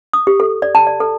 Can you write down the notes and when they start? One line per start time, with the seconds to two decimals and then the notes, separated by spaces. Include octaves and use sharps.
0.13 D#6
0.27 G4
0.40 A4
0.62 D5
0.75 A5
0.87 D5
1.00 A4